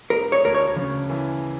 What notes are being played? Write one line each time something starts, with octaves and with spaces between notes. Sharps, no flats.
E1 A#4
C#5
D2 A#4
C#5
C#3
E3